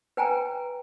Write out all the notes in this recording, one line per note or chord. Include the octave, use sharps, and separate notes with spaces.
B4 G5 G#5 A#5